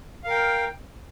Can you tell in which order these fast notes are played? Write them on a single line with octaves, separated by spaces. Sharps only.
F5 A#4 G5